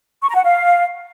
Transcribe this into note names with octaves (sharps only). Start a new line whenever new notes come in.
C#6
A#5
F#5
F5